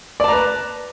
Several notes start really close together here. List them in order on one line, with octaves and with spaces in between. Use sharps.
D5 A5 A#5 B4